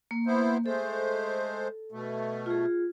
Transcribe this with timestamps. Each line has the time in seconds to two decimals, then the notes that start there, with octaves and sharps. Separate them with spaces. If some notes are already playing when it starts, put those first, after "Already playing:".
0.11 A#3
0.26 B3 E4 C5
0.66 G#3 A3 A4 C5
1.92 B2 A3
2.46 F4 G#4